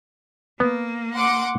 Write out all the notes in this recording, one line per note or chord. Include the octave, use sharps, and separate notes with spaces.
A#3 B3
F#5 C6 D6